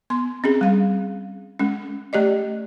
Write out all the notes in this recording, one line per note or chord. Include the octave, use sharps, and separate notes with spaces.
B3 C6
C4 C#4 G#4
G3 F5
G#3 C#4
A3 G4 D5 D#5